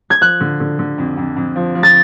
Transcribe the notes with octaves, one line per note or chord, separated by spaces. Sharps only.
G#6
F3 F#6
D3
D3
D3
F2
F2
F2
F3
F3
A6